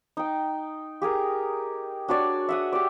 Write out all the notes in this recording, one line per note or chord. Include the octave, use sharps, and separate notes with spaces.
D#4 G5
G4 G#4 A#4
D4 F#4 C#5 D5
E5 F#5 D#6
G4 D5